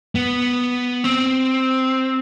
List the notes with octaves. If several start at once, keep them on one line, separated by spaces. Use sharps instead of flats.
B3
C4